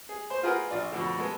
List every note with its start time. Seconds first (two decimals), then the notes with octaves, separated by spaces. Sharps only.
0.09 G#4
0.30 C5
0.43 F4 G#4 A#4 B4 F#5
0.71 A#1 F4 D5
0.92 F2 B2 D3
1.18 G#3 B3 A4 G#5